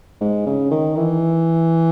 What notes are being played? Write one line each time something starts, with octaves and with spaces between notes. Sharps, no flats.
G#2
C#3
D#3
E3